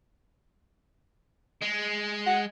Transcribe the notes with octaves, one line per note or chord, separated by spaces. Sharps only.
G#3
F#5